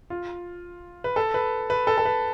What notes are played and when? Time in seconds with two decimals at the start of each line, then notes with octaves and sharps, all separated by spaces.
0.10 F4
1.04 B4
1.16 A4
1.34 B4
1.70 B4
1.87 A4
1.98 A4
2.05 B4